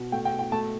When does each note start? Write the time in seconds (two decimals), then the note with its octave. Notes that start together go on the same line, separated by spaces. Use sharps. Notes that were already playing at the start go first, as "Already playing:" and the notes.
Already playing: B2
0.12 A3 G5
0.25 G5
0.33 B2
0.39 G5
0.52 A3 A5